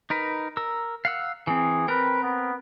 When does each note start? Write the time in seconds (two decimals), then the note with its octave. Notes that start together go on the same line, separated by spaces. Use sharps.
0.10 D#4 A#4 B4
0.57 A#4 E6
1.05 F5 F#5 E6
1.47 E3 C4 G#4
1.88 C4 A#4 B4 G5
2.22 B3